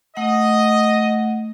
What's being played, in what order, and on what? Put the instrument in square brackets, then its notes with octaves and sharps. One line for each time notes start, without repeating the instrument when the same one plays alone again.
[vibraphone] A3 F#5 [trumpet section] D#5